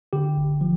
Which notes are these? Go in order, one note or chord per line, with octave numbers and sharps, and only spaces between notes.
D3 G4
G1
F3